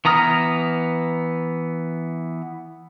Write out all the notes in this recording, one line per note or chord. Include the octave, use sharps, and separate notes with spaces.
E3 B3 A#5 D#6 F6